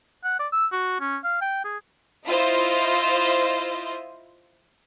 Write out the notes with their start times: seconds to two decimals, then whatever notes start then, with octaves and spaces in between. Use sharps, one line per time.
0.24 F#5
0.39 D5
0.52 E6
0.72 F#4
1.01 C#4
1.24 F5
1.42 G5
1.64 G#4
2.27 E4 F4 C5 D#5 E5